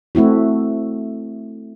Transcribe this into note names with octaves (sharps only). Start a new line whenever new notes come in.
A3 C4 E4 F#4